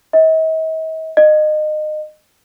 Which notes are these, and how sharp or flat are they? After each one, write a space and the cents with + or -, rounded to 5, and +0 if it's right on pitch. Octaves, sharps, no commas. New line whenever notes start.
D#5 +45
D#5 -25